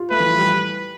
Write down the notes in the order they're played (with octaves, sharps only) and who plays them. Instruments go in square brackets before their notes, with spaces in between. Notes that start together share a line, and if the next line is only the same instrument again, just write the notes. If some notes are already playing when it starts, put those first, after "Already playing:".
Already playing: [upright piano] F4 G4
[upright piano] A3 [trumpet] B4
[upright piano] E3
F3
G3